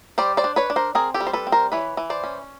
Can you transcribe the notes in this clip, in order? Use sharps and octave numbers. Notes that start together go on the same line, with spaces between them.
G3 C5 D5
C5 D5
D4
B4 C#5
D4
A#4 C5
C4 G#4 A#4
G4 A4
G3
C5
A4 B4
C4
A#4 C5
E3 B4 C#5
E3
C5 D5
C#4